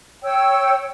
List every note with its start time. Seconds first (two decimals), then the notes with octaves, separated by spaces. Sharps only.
0.23 C#5 G5 E6